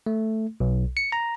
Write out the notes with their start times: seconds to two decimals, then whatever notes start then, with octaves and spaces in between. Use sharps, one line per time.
0.06 A3
0.60 B1
0.97 C#7
1.12 A#5